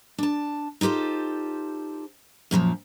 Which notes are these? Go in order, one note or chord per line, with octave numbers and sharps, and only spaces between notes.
D4 A5
D#4 F4 G4 A4 C5
F#2 A#2 E3 F3